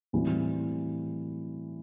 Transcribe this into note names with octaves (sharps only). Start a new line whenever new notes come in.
A2 E3 G3 C4 F#4